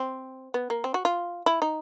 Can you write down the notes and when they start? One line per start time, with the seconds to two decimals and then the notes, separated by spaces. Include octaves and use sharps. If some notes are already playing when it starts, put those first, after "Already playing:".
Already playing: C4
0.54 B3
0.70 A#3
0.84 C4
0.94 F#4
1.05 F4
1.46 E4
1.62 D#4